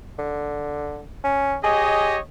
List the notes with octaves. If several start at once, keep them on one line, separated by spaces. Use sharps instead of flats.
D3
C#4
G4 G#4 C#5 D#5